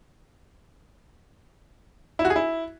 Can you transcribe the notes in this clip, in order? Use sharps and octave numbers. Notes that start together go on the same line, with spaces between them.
E4
F#4
G#4
E4